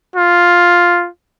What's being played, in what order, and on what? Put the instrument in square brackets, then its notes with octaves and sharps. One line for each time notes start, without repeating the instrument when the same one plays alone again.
[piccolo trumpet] F4